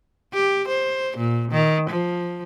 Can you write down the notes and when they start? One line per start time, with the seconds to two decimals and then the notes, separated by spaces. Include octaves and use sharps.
0.33 G4
0.68 C5
1.17 A#2
1.51 D#3
1.90 F3